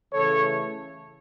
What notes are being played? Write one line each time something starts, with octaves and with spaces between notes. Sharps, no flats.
C#3 E3 A3 A4 C#5